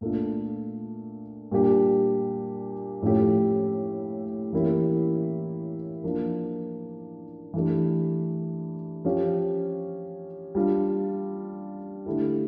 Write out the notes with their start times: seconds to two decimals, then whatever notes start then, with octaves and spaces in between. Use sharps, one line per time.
0.01 A#2 A3 D4 F4
1.51 A#2 G3 D4 G4
3.02 A2 F3 A3 C#4 G4
4.53 E3 A#3 C#4 E4 G4
6.03 F3 A#3 D4
7.53 E3 A3 D4 G4
9.05 F3 C#4 G4
10.55 G3 D4 F4
12.06 D3 A3 E4 G4